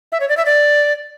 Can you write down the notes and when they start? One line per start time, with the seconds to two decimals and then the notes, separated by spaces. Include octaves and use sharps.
0.12 E5
0.20 C#5
0.29 D5
0.37 E5
0.46 D5